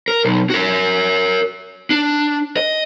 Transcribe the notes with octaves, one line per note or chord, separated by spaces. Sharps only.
A#4
B1
F#4 A#4
D4
D#5